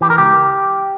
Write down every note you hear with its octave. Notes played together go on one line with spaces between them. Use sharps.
E3 G4
A#4
C#2 G4